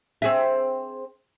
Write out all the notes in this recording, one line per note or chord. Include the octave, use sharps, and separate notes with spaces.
C4 G#4 E5